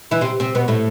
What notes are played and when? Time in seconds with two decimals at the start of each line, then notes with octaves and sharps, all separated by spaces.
0.11 E3 E4
0.21 C3 C4
0.40 C3 C4
0.55 B2 B3
0.68 A2 A3